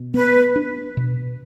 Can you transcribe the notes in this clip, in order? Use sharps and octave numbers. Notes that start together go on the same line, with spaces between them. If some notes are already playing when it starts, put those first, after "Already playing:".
Already playing: B2
B3 B4
D4
B2